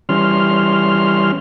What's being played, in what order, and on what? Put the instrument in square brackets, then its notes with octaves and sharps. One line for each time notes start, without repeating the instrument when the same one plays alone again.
[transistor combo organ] E3 G3 C#4 C6 F6